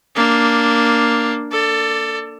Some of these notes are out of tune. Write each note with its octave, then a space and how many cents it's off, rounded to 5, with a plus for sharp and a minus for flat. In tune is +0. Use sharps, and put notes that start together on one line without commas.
A#3 +0 D4 +0
A4 +20 D5 +0